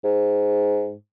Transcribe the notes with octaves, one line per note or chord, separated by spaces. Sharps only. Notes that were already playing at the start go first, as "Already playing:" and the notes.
G#2